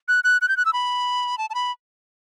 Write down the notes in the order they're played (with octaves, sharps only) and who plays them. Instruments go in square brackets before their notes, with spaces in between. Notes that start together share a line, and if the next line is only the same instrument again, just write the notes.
[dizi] F#6
F#6
F#6
G6
F#6
E6
B5
A5
A5
B5